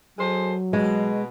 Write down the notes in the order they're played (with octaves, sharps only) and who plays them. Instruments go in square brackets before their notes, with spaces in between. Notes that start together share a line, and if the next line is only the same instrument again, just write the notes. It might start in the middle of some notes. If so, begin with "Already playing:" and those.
[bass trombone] F#3 [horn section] G#3 A4 C5
[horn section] B2 [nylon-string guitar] G#3